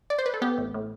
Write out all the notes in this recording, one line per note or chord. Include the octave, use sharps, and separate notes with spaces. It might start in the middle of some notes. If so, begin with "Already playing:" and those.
D5
C5
B4
A4
B3 G4
A1
A2